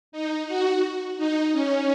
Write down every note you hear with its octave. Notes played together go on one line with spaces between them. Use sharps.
D#4
F#4
D#4
C#4